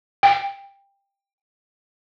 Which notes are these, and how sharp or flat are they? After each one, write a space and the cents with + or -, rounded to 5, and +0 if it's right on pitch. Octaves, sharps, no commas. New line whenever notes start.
G5 +20